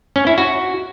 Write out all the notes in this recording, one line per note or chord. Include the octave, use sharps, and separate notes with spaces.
C#4
E4
F#4